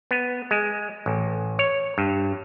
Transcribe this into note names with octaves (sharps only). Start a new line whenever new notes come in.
B3
G#3
A1
C#5
G2